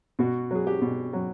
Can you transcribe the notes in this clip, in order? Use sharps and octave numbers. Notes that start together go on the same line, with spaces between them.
B2 F#4
F#3 G#4
G4
B2
F#3